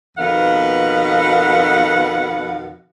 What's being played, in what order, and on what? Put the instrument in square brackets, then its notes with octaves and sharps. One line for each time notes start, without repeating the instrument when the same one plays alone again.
[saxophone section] F2 B2 D#3 B3 F5 F#5